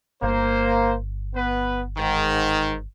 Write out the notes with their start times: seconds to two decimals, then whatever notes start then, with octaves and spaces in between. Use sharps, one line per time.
0.23 G1 A#3 C5
1.35 B3 B4
1.97 G#2 D#3